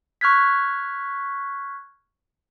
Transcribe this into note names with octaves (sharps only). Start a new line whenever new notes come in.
C#6 F6 F#6 G#6 B6